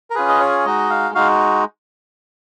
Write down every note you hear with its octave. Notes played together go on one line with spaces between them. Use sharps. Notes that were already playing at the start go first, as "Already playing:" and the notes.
A#4
C#4 F4 G#4 B4
D#5
C#5
G#3 D#4 F#4 D#5
F5
G#3 D#4 F#4 F5